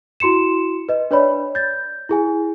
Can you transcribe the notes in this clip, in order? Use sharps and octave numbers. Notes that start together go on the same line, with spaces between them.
E4 F#4 C6 C#7 E7
B4 D#5
D4 B4 C#5 D5 B5
G6 A6
E4 G#4 G#5